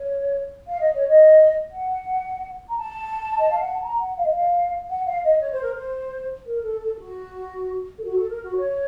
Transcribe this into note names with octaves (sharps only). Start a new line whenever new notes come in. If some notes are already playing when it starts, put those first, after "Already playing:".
Already playing: C#5
F5
D#5
C#5
D#5
F#5
A#5
A5
D#5
F5
F#5
A5
A#5
F#5
F5
D#5
F5
F#5
F5
D#5
C#5
C5
A#4
C5
A#4
A4
A4
A4
F#4
A4
F#4
A4
A#4
F#4
C#5